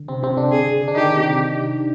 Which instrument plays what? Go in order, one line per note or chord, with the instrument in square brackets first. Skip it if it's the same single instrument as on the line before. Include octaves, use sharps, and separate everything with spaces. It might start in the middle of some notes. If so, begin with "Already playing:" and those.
Already playing: [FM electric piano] D3
C3 C4
C3 C4
D3 D4
[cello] G#4
[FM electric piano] D4
[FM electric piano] D#3 D#4 [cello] G4
[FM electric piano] C3